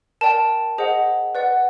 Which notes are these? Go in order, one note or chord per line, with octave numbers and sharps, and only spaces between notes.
A#4 D5 G5 A5
G#4 C5 D#5 F#5
B4 D5 F#5